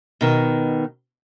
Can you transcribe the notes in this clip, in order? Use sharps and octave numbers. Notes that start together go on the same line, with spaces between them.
B2 D#3